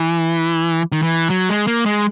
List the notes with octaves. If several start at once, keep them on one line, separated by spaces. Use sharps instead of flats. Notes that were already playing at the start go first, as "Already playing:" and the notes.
Already playing: E3
D#3
E3
F#3
G#3
A#3
G#3